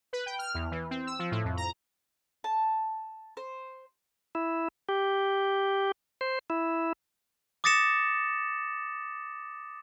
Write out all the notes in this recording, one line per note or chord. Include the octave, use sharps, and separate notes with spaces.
B4
G5
F6
E2
E3
C4
E6
F3
A2
F2
A#5
A5
C5
E4
G4
C5
E4
D6 D#6 A6 A#6 C#7 E7